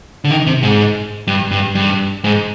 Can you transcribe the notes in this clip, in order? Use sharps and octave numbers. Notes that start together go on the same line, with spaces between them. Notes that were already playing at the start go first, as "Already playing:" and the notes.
D3
D#3
C3
G#2
G2
G2
G2
G#2